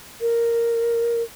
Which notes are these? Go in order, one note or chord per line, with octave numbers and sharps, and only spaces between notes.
A#4